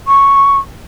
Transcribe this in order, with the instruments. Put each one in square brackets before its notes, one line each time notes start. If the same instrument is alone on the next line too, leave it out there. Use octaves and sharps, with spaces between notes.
[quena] C#6